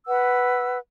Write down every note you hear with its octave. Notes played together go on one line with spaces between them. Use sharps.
B4 F#5 E6